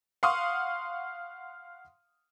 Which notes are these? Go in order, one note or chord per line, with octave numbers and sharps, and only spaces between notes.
F5 F#5 C6 C#6 D#6 F6